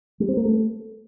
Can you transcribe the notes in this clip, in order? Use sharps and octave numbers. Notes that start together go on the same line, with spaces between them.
G3
C4
A#3
A3